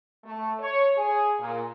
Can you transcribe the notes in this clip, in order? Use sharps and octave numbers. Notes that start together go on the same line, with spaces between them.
A3
C#5
G#4
A#2